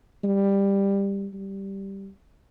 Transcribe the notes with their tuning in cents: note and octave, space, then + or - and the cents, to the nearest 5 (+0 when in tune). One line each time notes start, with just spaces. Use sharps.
G3 +15
G3 -5